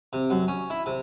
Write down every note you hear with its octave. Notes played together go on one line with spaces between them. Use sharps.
C3
F#2
C#4
E4
C3